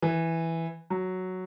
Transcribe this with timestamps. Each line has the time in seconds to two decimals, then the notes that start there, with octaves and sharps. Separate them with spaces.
0.02 E3
0.90 F#3